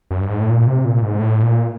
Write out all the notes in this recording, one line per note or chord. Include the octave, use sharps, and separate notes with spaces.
F#2
G2
G#2
A2
A#2
C3
A#2
G#2
A2
A#2